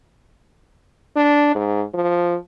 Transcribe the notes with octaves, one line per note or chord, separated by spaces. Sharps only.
D4
G#2
F3